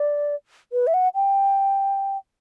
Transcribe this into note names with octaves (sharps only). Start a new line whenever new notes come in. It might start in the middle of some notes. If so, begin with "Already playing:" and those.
Already playing: D5
B4
E5
F#5
G5